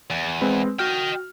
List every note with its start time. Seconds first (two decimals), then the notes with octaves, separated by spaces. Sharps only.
0.10 E2
0.41 G#3 C4 B4
0.79 F#4 D#5 G5 F6